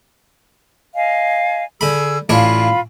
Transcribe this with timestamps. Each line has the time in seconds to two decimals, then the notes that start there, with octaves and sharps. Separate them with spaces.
0.95 D#5 F5 G#5
1.81 D3 G#4 B5 E6
2.29 A1 D4 F4 C#5 F5 B5